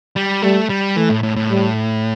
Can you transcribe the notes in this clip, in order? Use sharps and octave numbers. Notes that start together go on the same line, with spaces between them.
G3
G3 A3
G3
E3 A3
A2
A2
A2
G3